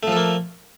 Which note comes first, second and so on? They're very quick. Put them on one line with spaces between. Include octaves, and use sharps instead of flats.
A3 F3 A4 A#3